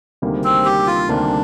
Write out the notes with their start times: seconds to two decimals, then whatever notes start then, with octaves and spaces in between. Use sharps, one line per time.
0.22 D2 C3 D#3 G3 A#3
0.44 C4
0.65 G4
0.87 F4
1.09 D2 C3 D#3 G3 A#3 D4